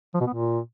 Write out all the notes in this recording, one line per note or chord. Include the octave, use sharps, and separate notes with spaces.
F3
B2
B3
A#2